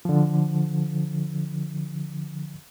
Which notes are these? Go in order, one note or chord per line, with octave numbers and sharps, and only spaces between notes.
D3 F3